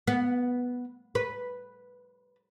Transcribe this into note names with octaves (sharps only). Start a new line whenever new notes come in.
B3
B4